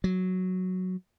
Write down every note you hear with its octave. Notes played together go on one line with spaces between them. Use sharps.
F#3